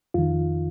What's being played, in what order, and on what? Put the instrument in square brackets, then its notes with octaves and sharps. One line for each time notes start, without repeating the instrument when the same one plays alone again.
[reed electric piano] F2 D#3 F4